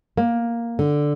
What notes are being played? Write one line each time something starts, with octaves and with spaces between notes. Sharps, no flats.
A#3
D3